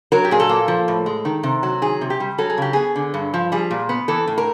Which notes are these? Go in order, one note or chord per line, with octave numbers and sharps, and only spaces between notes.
F#3 A#4
G4
A#2 G#4
A4
A#3
F3
A2
G#3
D#3
C3
F#3
D#3 G#4
C3
G4
G3
F#3 A4
G#4
C#3 G4
B3 G#4
D3
G2
F3
G3 G#4
A#2
B3
E3 A4
A2
A#4